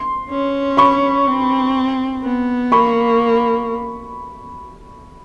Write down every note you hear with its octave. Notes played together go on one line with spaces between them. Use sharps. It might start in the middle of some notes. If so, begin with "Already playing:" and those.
Already playing: C6
C#4
B5 C#6
C4
B3
A#3 B5 C#6